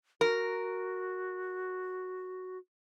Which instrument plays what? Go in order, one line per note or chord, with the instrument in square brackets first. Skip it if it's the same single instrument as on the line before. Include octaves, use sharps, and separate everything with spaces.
[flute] F#4 [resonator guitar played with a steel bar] A#4